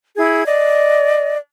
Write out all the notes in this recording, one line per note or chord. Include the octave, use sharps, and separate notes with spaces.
E4 G#4 G#6
D5 D#5